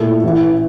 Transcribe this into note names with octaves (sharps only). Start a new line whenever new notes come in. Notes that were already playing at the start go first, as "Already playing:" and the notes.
Already playing: A#2 A3 E4 A4
A1 A2 E3